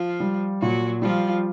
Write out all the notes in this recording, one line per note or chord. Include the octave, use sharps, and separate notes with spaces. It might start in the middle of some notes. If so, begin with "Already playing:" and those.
Already playing: F3 F4
G3
A#2 F#3 F#4
F3 G3 F4